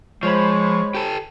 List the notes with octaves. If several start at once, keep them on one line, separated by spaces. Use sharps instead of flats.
F3 G#3 C5 C#5 B5 C#6
G4 A4